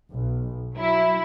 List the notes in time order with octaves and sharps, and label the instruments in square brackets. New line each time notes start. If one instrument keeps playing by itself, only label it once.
[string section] B1
F#3 E4